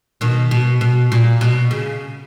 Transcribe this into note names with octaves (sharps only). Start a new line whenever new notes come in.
B2 D#3
B2
B2
A#2
B2
C#3